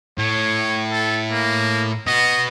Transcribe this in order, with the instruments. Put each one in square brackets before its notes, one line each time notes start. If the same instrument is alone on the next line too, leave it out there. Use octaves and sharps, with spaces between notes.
[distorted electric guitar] A2 [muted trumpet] C#5
[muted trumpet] A4
A#3
[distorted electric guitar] B3 F#4 [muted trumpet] D#5